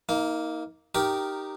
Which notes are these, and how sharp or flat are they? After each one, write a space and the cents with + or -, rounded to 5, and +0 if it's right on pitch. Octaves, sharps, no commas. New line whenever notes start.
A#3 +0 D#4 +35
D#4 -15 G4 -10 A#4 +0